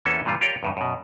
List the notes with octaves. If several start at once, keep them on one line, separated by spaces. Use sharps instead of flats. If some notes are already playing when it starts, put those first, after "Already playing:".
E2 E3 A#3 C#4 A4 E5
G2 A#2 E3 G3 F4
F4 G4 A#4 C#5 D5 G5
E2 G2 C#3
F#2 B2